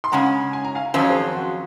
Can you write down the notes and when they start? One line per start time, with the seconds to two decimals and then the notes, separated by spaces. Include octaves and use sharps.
0.04 C6
0.12 C#3 G#3 C#4 F#5 A#5
0.53 G#5
0.65 A#5
0.75 F5 G#5
0.94 F2 D#3 F#3 C#4 F4 C5
1.01 C#5
1.10 G#4 C5
1.35 F#4